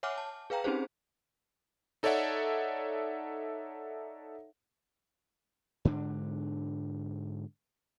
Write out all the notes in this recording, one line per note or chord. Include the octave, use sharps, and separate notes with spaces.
C#5 E5 F#5 G#5 D6 F6
A5
G#4 B4 F5 G5 A#5
C4 C#4 D#4 G4 G#4 C5
D#4 A4 C#5 D5 E5 F#5
G#2 D3 D4